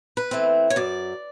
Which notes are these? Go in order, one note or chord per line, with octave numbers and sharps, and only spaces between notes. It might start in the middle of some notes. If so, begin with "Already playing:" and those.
B4
E3 A3 C4
C#5
F#2 D5